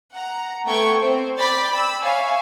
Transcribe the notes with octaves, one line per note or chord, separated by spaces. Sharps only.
F#5 A#5
A3 B3 G5 C#6 G#6
C4 C5
D5 G5 B5 A6 B6
B5 E6
C#5 E5 F5 G#5